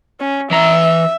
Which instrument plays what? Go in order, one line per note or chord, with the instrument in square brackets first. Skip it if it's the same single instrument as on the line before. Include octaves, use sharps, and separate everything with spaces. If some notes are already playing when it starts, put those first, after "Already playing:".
[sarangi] C#4
[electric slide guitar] E3 A#5 [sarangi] E5